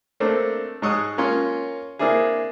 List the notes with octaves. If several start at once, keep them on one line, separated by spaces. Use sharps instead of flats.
A3 A#3 C4 D4
G#2 G#3 C#6 D#6 F#6
A#3 C#4 F4 C#5 C6
A#3 C4 D4 E4 G#4